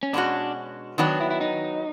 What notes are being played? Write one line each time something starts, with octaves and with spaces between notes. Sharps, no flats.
C#4
B2 G#3 C#4 D4 F#4
D#3 F#3 B3 D4
E4
E4
D#4